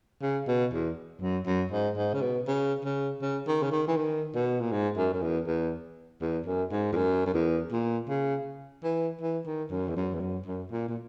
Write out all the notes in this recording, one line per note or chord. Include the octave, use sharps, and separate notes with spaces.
C#3
B2
E2
F#2
F#2
G#2
G#2
C#3
B2
C#3
C#3
C#3
D#3
C#3
D#3
E3
D#3
B2
A#2
G#2
F#2
F#2
E2
E2
E2
F#2
G#2
E2
F#2
F#2
E2
A#2
C#3
E3
E3
D#3
F#2
E2
F#2
E2
F#2
F#2
A#2
A#2